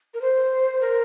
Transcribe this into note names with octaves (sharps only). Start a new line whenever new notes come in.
A#4
C5
A#4